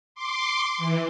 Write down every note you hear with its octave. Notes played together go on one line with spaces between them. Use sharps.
C6 D6
E3